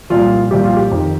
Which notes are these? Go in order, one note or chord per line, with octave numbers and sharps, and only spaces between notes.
C2 A#2 F3 F4
C2 A#2 F3 G4
F4
G4
F2 D#3